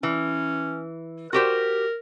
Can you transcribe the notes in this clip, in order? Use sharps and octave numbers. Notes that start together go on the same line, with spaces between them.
E3 C#4
F#4 G4 A#4 C5